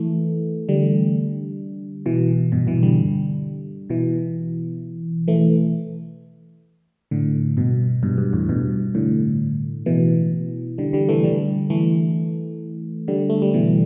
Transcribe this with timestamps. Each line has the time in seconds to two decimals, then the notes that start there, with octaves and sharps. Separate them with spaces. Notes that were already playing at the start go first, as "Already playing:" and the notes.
Already playing: E3 A3
0.69 D3 G3
2.06 B2 E3
2.52 G2 B2
2.67 B2 E3
2.83 D3 G3
3.90 B2 E3
5.28 E3 A3
7.11 A2 D3
7.57 G2 B2
8.03 G2 B2
8.18 G2
8.33 E2 A2
8.49 G2 B2
8.95 A2 D3
9.86 B2 E3
10.78 D3 G3
10.93 D3 G3
11.09 E3 A3
11.24 D3 G3
11.70 E3 A3
13.08 D3 G3
13.30 A3
13.42 G3
13.54 B2 E3